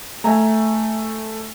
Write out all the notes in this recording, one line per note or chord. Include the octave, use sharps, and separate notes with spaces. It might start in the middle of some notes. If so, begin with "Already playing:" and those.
A3 E5 G#5 A#5